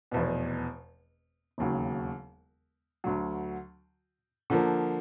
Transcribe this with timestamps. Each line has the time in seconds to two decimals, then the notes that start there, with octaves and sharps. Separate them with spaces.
0.12 F1 E2 B2
1.58 E1 D#2 C#3 F#3
3.04 D2 D3 F#3
4.50 D3 F3 A#3